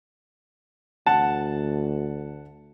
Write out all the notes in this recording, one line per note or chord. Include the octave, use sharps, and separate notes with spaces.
D2 F#5 A5